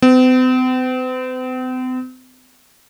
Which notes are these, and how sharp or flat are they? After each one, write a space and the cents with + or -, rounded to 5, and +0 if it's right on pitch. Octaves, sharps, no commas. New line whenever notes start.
C4 -45